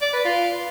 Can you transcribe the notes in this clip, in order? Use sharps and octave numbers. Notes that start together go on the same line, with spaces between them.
D5
B4
F4